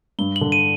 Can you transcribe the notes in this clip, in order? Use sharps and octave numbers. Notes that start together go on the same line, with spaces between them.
G2 G7
F#7
D3
D#7